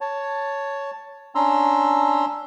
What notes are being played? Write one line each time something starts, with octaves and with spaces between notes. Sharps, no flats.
C#5 A5
C#4 D4 A#5 C6 E6